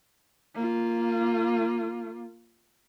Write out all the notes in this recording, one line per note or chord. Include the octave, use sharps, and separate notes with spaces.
A#3 F4